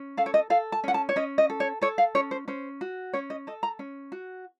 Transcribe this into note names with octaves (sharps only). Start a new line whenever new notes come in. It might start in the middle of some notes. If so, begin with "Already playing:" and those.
Already playing: C#4
A4 F5
C#5
D#5
A4 F5
A5
C#4 F#5
A5
C#5
C#4 D#5
D#5
A4
C#5
A4 C#5
F5
C#4 C#5
C5
C#4 C5
F#4
C#4 C#5
D#5
A4 D#5
A#5
C#4
F#4